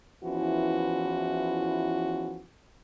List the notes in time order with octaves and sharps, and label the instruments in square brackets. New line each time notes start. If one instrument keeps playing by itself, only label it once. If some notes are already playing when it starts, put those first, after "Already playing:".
[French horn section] E2 E3 F3 C#4 E4 F#4